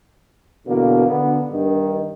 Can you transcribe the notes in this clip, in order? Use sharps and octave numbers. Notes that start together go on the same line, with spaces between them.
E2 B2 D3 A#3
D3 B3
G2 D#3